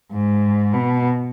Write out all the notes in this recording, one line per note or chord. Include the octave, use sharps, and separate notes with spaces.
G#2
B2